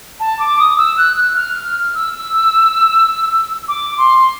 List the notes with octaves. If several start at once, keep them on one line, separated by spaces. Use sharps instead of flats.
A5
D6
D#6
E6
F#6
F#6
F6
E6
D6
C6